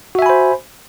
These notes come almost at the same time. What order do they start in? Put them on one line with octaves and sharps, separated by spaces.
F#4 E5 G#5 B5 C5